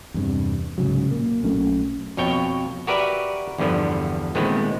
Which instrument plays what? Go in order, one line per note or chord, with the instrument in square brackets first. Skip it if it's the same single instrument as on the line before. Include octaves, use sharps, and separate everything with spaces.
[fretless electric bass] E2 G2 C3
C2 G#2 C#3 F#3
A#2 A#3
B1 F#3 A3 C#4
[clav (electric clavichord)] F2 B2 C#5 G5
F#4 G4 A#4 B4 D5 E5
E2 G2 D3 F3 B3
A#2 D#3 G#3 A3 B3 C4